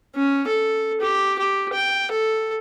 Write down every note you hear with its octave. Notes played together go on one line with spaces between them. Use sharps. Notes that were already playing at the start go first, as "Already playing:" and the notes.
C#4
A4
G4
G4
G5
A4